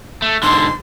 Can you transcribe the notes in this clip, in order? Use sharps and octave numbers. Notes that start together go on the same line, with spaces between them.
A3
G#2 D3 C6